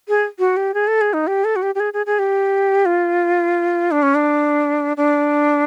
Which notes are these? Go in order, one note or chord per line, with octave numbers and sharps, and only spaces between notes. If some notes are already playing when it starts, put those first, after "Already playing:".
G#4
F#4
G4
G#4
A4
G#4
D#4
G4
A4
F#4
G4
G4
G#4
G#4
G#4
G4
F4
D4
C#4
D4
D4